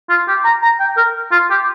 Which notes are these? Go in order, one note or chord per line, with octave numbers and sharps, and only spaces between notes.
F4
G4
A#5
A#5
G5
A#4
F4
G4